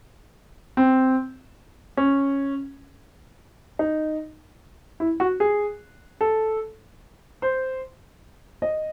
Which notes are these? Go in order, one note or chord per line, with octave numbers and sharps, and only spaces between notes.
C4
C#4
D#4
E4
F#4
G#4
A4
C5
D#5